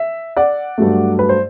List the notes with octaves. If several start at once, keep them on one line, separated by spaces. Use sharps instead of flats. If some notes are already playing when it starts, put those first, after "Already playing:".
Already playing: E5
D5 F#5
G2 F#3 A3
B4
C5